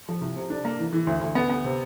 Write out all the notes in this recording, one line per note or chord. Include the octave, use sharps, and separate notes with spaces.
F3
C2
C3
D4
A#3
E3
E3
D2
D2
B3
B3
C3